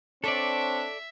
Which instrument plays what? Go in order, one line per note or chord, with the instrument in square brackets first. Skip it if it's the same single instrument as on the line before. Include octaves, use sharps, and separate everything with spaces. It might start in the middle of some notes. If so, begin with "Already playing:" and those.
[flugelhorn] C4 [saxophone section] D4 C#5 [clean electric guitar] A4 D5 [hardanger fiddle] E5